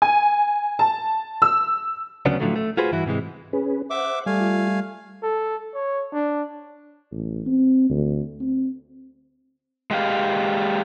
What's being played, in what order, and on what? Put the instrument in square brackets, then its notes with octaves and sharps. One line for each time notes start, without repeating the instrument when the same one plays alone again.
[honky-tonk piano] G#5
A5
E6
[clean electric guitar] D2 C#3 F#3 B3 C#4 D4
A2 D3 F3 F#3 A3
A3
F4 F#4 G#4 B4 C5
G2 E3 E4 F#4
G#2 C3 E3 G#3
[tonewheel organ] C#4 G#4 B4
[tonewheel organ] C5 F#5 [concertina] E5 D6
[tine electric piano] G3 [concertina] A3 F5 G#5
[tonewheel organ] F4
[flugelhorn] A4
C#5
D4
[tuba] A1
C4
D2
C4
[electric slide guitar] G#3 G4 F5